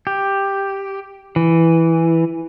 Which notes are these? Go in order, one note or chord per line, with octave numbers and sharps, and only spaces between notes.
G4
E3